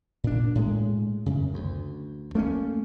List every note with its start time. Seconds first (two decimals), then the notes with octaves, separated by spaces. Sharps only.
0.24 A#2 D4
0.55 A2 G#3
1.26 F#2 C#3
1.54 D2
2.35 A3 A#3 C4 C#4